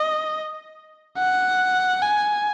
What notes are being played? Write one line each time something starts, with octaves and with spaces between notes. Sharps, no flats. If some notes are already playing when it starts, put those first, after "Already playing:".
Already playing: D#5
F#5
G#5